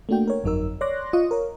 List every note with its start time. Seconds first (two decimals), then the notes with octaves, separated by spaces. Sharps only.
0.09 A3 A#3 D4 F#4 G5
0.28 A#4 C#5
0.44 G1 F2 F#3 D#4 A#4 E6
0.81 C#5 D5 C6 D6 F#6 A#6
1.13 F4 D#5 C#6 D#6
1.31 A#4 C#5